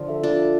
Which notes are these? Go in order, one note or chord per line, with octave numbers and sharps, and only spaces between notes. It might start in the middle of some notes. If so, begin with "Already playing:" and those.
Already playing: D3 F3
A4 E5
D4 F4
A4 E5